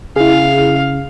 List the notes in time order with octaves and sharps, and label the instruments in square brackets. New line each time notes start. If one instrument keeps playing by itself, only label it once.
[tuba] C#3 [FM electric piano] E4 G#4 [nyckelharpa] F5